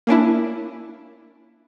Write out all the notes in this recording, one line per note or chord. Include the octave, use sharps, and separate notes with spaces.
A#3 C#4 D4 E4